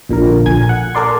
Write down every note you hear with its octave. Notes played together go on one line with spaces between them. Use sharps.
A#1 A#2 D3 A#4
A#1 G#5 G#6
F#5
A4 A#4 D5 C6